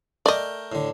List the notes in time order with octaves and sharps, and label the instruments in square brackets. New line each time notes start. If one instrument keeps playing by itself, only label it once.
[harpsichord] A3 A#4 G5 [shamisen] D5 D#5
[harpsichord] A2 D3